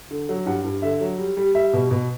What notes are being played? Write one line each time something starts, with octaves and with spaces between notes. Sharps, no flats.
D3
F#3
G2 F#5
G2
D3 E5
F#3
G3
G3
G3 E5
B2
B2